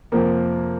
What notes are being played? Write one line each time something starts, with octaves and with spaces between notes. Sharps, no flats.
F2 C3 F3 A#3 C4